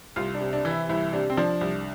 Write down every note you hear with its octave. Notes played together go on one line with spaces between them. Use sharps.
C2 F4
D4
C3
D4
E3
E4
C2 E4
C3 D4
C4
F3 D4
C2